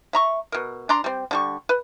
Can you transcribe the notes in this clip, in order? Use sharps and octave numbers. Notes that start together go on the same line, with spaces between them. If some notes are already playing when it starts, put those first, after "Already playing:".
E5 A#5 C#6
B2 A#4
D4 D5 A#5 C6
G3 C4
D3 G3 C#6
B4